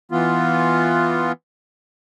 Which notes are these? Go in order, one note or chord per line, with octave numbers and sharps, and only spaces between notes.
E3 B3 F4